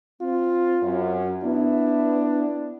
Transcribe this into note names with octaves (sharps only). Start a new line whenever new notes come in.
C4 F4
F#2
B3 D4 E4